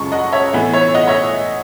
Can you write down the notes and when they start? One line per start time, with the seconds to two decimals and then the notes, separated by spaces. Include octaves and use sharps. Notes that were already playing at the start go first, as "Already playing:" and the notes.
Already playing: F#2 C#3 G#3 A5 C#6
0.12 D#5 F#5
0.32 C#5 E5
0.53 A2 E3 B3
0.73 C#5 E5
0.94 D#5 F#5
1.07 C#5 E5